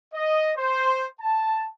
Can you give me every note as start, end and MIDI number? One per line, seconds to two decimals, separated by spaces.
0.14 0.52 75
0.57 1.07 72
1.21 1.68 81